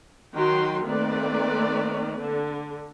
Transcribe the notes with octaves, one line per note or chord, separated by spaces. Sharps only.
D#3 F#3 F#4 G5 C6
D#3 A3 A#3 C4 B4 D5
D3